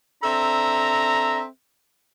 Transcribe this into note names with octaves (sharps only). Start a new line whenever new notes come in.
C4 D4 A4 E5 A#5